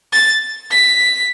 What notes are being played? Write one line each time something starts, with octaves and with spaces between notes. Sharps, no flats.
A6
B6